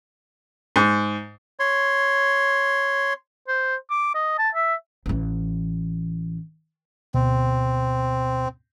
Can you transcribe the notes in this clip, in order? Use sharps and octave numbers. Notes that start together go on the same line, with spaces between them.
G#2
C#5 C6
C5
D6
D#5
A5
E5
A1 E3
D2 B2 C4